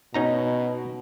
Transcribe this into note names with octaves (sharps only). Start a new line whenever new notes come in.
B2 C#4 D#4 A#5